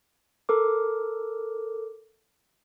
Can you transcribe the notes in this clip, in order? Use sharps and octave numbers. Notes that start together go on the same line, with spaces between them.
A4 A#4 D6